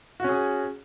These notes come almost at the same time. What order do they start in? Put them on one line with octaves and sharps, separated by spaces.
F#4 C#4 G#4